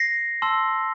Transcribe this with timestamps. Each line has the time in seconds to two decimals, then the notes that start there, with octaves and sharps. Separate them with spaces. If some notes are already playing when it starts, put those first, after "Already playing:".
Already playing: A#6 C7
0.42 A5 C6 E6